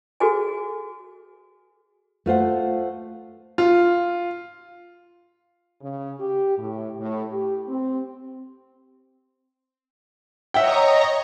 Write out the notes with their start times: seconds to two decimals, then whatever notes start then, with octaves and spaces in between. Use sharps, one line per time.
0.20 F#4 G#4 A4 B4 G#5
2.26 A3 F4 C5 F#5
3.58 F4
5.82 C#3
6.20 G4
6.57 A2
7.00 A2
7.31 G4
7.68 C4
10.54 C#5 D#5 E5 F#5 G5 A#5